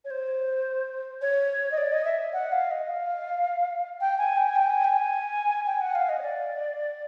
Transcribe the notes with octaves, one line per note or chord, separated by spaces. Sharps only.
C#5
C5
C#5
D#5
D5
D#5
E5
F#5
F5
D#5
F5
G5
G#5
G5
G#5
G5
G#5
G5
G#5
G5
F#5
F5
D#5
C#5
D5